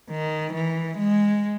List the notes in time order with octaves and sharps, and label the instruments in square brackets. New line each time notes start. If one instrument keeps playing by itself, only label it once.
[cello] D#3
E3
G#3